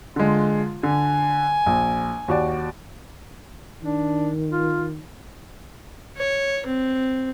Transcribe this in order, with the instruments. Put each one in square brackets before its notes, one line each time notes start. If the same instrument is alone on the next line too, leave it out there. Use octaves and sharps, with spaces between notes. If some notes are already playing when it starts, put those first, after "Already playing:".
[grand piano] D3 G#3 [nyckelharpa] F4
[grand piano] D3 [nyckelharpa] G#5
[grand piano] A#1
D#2 F#4 D5
[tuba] D#3 [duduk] D4
[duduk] F4
[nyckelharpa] C#5
C4